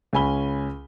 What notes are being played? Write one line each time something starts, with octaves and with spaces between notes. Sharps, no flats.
C#2 C#4 G#5 B5 G7